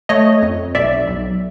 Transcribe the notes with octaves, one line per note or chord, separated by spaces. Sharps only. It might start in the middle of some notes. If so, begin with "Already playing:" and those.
A3 C#5 D#5
F2
B1 D5 E5
B1